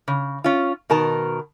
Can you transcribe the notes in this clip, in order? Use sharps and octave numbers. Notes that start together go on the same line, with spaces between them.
C#3
C#4 F4
B2 D#3 A#4 A5